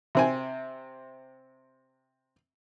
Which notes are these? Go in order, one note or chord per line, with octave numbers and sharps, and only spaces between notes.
C3 C4 G#5